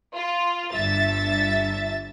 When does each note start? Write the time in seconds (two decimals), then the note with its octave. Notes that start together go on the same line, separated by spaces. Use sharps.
0.14 F4
0.71 G1 G2 E5 A6